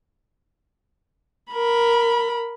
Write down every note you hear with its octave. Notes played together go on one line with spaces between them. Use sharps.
A#4 B5